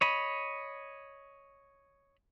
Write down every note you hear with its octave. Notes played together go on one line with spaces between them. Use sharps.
C#5 D#5 B5